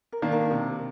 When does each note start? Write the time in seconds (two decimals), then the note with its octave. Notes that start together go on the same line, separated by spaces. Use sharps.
0.12 A#4
0.22 D#3 A#3 D4
0.32 A#4
0.51 C3